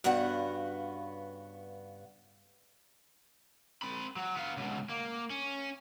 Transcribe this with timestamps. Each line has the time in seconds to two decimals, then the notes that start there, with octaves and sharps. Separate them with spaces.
0.04 G2 C#3 B3 F#4 F#5
3.82 C4 B5
4.16 F#3
4.35 B3 F5
4.57 C#2 B2
4.89 A#3
5.30 C#4